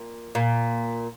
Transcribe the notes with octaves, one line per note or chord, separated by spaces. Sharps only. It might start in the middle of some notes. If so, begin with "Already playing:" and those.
Already playing: A#2
A#2